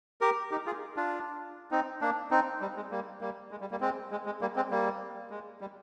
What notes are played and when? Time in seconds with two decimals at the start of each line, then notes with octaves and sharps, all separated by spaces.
0.21 G4 A#4
0.51 D#4 G4
0.66 F4 G#4
0.97 D4 F4
1.71 C4 D#4
2.01 A#3 D4
2.31 C4 D#4
2.61 G3
2.76 G#3
2.91 G3 A#3
3.21 G3 A#3
3.51 G#3
3.61 G3
3.71 G3 A#3
3.81 G#3 C4
4.11 G#3
4.26 G#3
4.41 G3 A#3
4.56 G#3 C4
4.71 G3 A#3
5.30 G#3
5.61 G3